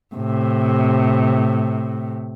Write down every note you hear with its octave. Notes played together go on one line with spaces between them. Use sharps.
A2 C3